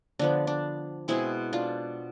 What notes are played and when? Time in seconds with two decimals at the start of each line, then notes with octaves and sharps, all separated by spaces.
0.19 D3 F3 B3 D4
0.47 D4
1.08 B2 G#3 C4 E4 G#4
1.53 D4 F4